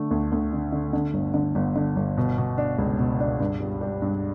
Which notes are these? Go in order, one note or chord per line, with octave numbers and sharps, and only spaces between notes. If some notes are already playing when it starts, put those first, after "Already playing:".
Already playing: D3 A3
D2
D2
D3
D3
D3
G1
D3
G1
D3
G1
B2
B2
D4
C#2
B2
D4
G2
G3
G3
G2